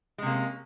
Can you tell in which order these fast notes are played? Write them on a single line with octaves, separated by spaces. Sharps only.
G#3 C3 A#3 C#4